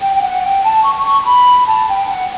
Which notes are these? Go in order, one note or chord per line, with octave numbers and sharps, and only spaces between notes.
G5
G5
F#5
G5
A5
C#6
C#6
B5
A5
G5
F#5